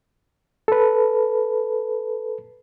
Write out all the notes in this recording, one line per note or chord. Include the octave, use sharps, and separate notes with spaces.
A4 B4